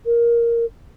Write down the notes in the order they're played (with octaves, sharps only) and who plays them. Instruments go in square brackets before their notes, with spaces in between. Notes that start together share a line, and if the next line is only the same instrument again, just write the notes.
[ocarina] A#4